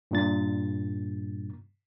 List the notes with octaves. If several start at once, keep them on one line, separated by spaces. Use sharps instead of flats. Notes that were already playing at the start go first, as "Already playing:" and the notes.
G2 A#2 A6